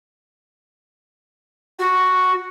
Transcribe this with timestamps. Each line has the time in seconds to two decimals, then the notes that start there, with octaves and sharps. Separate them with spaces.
1.79 F#4